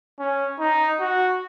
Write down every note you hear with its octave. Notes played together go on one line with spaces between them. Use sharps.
C#4
D#4
F#4